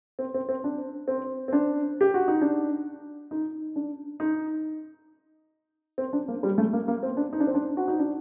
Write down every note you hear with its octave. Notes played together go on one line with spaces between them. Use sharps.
C4
C4
C4
D4
C4
C4
D4
G4
F#4
D#4
D4
D#4
D4
D#4
C4
D4
A#3
G3
A3
A#3
A#3
C4
D4
D#4
D4
C4
D4
F#4
D#4
D4